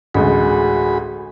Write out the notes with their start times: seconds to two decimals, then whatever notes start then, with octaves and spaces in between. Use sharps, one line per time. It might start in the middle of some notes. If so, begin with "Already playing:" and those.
0.14 A1 D2 G#3 F#4 G#4 B5